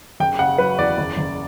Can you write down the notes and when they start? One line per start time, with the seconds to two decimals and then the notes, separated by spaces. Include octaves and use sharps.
0.20 F#1 G5
0.39 C#3 F#5
0.58 F#3 B4
0.78 E2 D5
0.98 F#1
1.17 F#1